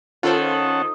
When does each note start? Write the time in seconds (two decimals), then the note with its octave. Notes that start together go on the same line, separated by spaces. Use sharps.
0.23 D#3 C#4 F4 A4 C5 F#5 A5